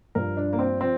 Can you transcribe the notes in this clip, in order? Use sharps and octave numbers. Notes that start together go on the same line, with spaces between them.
G2 F3 A#4
D4
A#3
C4
F3 C4